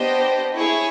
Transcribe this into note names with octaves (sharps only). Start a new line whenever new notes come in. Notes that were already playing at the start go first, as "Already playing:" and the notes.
Already playing: B3 D4 G4 C5 D#5
E4 G#4 C#5